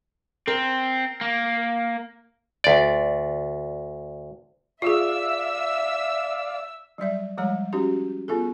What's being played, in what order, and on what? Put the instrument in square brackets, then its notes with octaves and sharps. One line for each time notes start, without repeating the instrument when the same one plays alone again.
[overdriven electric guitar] C4 [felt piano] A#4
[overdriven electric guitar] A#3
[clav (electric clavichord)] D2 D5
[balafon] F4 G#4 [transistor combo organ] D5 F5 [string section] E5 E6
[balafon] F#3 G3 D5 E5
F3 G3 G#3 C#5 A#5
C#4 D#4 F#4 G4
B3 F4 G#4 A4